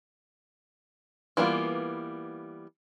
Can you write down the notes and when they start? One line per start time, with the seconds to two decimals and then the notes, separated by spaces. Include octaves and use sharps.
1.37 E3 G3 A#3 B3 F4